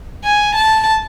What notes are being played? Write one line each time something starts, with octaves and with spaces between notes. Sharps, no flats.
G#5
A5